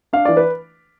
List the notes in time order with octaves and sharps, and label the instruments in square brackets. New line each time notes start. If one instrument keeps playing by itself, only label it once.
[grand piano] D4 F5
E3 D5
B4